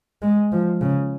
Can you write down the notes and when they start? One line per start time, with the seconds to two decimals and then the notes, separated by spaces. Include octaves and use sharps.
0.22 G#3
0.52 F3
0.81 C#3